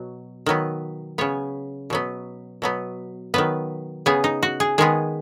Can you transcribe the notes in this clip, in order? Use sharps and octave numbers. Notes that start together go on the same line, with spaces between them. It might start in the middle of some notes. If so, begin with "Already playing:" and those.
Already playing: B2 F#3
D#3 F#3 B3
C#3 B3 C#5
B2 F#3 B3
B2 F#3 B3
D#3 F#3 B3 B4
C#3 B3 G#4
D#4
F#4
G#4
D#3 G#3 B3 G#4